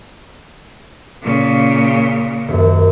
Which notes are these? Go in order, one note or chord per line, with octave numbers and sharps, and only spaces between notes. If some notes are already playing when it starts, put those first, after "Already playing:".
A#2 C#3
D#1 F#2